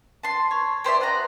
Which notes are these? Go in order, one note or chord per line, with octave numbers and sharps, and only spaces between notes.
A5 C6
C#5
G4 C5 D5 E5
B3 F#5 A#5